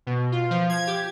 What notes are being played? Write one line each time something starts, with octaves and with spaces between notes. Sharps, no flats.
B2
F4
F3
G#6
G4